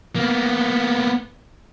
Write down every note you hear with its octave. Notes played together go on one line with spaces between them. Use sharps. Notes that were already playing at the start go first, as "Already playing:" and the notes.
A#3 B3